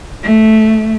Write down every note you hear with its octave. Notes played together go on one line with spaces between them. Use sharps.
A3